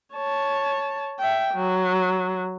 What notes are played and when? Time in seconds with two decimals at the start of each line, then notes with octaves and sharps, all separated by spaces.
0.14 C#5 A5
1.20 E5 G5
1.54 F#3